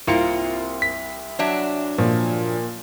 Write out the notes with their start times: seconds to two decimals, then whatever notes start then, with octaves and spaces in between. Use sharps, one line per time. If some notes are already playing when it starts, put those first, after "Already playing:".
0.07 C2 A#3 C4 F4 A#5 C6 C#7
0.82 B6
1.39 F#3 D4 E5
1.98 A#2 F3